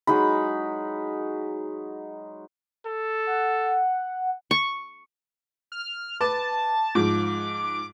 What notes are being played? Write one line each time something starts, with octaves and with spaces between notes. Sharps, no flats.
F#3 G#3 D#4 B5
A4
F#5
C#6
F6
B4 A5 D6
G#2 F3 D6